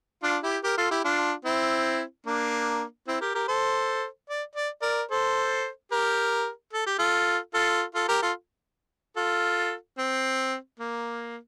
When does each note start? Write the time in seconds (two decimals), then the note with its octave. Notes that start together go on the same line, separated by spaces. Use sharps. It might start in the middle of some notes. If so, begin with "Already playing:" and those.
0.23 D4 F4
0.43 E4 G4
0.64 G4 A#4
0.77 F4 A4
0.91 E4 G4
1.04 D4 F4
1.45 C4 E4
2.26 A#3 D4
3.08 C4 E4
3.21 G4 A#4
3.35 G4 A#4
3.48 A4 C5
4.30 D5
4.55 D5
4.81 A#4 D5
5.11 A4 C5
5.92 G4 A#4
6.73 A4
6.86 G4
6.99 F4 A4
7.54 F4 A4
7.95 F4 A4
8.08 G4 A#4
8.22 F4 A4
9.16 F4 A4
9.98 C4
10.80 A#3